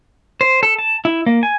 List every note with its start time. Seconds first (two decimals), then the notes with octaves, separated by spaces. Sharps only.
0.41 C5
0.63 A4
0.79 A5
1.05 E4
1.26 A#3
1.43 G#5